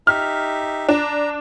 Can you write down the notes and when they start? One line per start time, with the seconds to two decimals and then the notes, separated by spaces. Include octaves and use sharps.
0.07 D#4 G4 E5 F6
0.89 D4 A#5